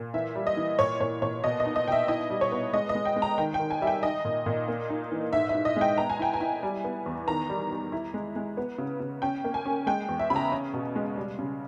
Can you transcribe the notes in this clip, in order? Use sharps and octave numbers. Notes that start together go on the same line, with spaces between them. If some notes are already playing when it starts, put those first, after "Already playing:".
Already playing: A#2
E3 E5
G3
D#5
E3
A#2 C#5
A#2 C#5
A#2 C#5
B2 D#5
D#5
D#4
D#5
B2 G5
E5
E4 D#5
G3
C#5
B3
G#3 D#5
D#5
G#3
G5
G#3
A#5
D#3 G5
G5
D#3
G#5
G3 E5
G5
D#4 D#5
A#2
A#2
A#3
D#4
E3
G#2 E5
E5
G#2
D#5
G#3 G5
B3 A#5
G#5
E4 G5
G#5
E4
G3
B3
E2
D#3 A#5
G3
G3
E4
G#3
G#3
B3
C#3
C#3
C#4 G5
A#3
G#5
C#4
G#3 G5
E2
E5
C#3 B5
A#5
C#4
B2
G#3
G3
C#3